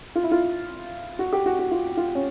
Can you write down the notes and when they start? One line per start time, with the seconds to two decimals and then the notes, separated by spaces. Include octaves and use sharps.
0.15 F4
0.23 E4
0.31 F4
1.19 F#4
1.33 G4
1.46 F#4
1.59 F#4
1.71 F4
1.97 F4
2.15 C#4